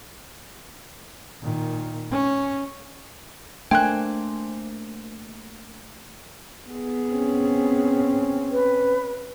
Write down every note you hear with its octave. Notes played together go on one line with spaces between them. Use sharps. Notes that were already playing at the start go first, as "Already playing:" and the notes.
A#2 D#3
C#4
A3 A#3 D4 C5 G5 G#5 F#6
B3 G#4
C4 C#4
B4